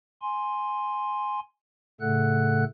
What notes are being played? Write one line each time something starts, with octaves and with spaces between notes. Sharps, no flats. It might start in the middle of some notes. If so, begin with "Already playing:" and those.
G#5 C6
A2 C#3 A3 A4 F#5 F#6